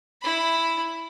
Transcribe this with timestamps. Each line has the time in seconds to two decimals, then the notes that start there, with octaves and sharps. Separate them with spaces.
0.21 E4 B5